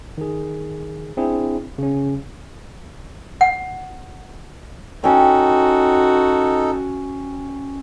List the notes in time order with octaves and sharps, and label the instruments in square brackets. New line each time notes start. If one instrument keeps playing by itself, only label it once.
[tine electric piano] D#3 G#4
C4 D4 E4 G#4
C#3 C#4
[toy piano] F#5
[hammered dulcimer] C#4 G5 [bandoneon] D#4 A4 [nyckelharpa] F#4